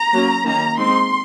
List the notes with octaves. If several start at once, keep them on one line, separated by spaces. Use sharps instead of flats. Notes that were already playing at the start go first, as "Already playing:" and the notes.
Already playing: A#5
F#3 A#3 C#4
D#3 A#3 C#4 A#5
G#3 C4 D#4 C6